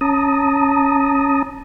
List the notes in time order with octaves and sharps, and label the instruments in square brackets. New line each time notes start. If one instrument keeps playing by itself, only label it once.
[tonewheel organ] C#4 A5 A#5 D#6